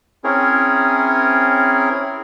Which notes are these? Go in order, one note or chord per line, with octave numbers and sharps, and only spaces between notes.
C4 C#4 E4 G#4 A#4 C#5